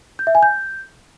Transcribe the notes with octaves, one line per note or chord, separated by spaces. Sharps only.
G6
E5
G#5
G6